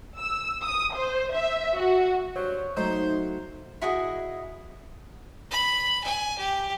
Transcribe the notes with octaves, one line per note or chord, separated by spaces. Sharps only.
E6
D#6
C5
E5
F#4
G2 F#3 C5 C#5
F#3 A3 D#4 C5
E4 F#4 G#4 D#5
B5
G#5
G4